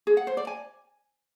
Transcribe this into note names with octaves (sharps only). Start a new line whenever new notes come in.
G#4
F#5
C5
D5
G#5